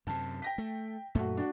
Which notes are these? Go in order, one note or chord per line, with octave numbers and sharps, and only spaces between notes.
F#2 C3 A5
G5 A#6 B6
A3
F#2 A#2 A3 F#4
D4 F#4